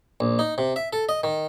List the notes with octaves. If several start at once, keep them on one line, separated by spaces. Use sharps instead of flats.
A#1
D#4
C3
E5
A4
D#5
D#3